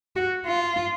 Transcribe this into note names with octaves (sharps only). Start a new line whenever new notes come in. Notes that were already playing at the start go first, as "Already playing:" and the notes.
F#4
F4